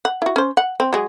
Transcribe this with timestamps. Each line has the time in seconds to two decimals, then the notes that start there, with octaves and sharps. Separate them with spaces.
0.05 F#5
0.22 E4 F#4
0.36 C#4 C5
0.57 F#5
0.80 C4
0.93 F#3 G#3 G#4